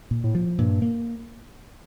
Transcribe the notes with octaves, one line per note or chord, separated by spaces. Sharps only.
A#2
A2
F3
G2 A#2
A#3